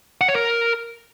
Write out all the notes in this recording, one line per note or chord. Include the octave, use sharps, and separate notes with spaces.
F#5
C#5
A#4